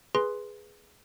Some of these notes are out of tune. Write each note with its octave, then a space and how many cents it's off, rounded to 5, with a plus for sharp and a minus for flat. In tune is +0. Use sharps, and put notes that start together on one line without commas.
G#4 +0 B4 +0 C6 +0